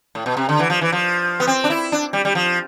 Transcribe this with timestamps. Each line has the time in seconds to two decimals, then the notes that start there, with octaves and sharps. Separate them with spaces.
0.15 A2
0.26 B2
0.37 C3
0.49 D3
0.59 E3
0.70 F3
0.81 E3
0.92 F3
1.40 B3
1.47 C4
1.64 D4
1.70 E4
1.92 D4
2.13 G3
2.25 G3
2.35 F3